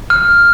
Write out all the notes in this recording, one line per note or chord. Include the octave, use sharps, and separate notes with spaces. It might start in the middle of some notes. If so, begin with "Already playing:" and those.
F6